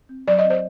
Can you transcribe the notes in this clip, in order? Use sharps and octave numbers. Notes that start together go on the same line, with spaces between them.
C4
F#3 D5
D#5
C4
C5